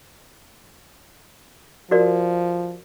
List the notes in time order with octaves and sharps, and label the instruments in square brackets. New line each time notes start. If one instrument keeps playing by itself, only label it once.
[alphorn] F3 [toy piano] F#4 A#4 D5